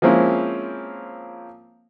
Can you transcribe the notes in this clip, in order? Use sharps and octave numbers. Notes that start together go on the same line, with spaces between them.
F3 G#3 A#3 C4 C#4 E4